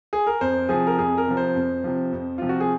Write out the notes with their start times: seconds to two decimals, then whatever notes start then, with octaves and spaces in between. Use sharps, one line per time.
0.13 G#4
0.27 A#4
0.41 F2 C5
0.69 C3 F3 G#4
0.87 A#4
0.99 F2 G#4
1.18 A#4
1.27 C3 F3
1.37 C5
1.55 F2
1.84 C3 F3
2.12 F2
2.38 C3 F3 F4
2.49 F#4
2.60 G#4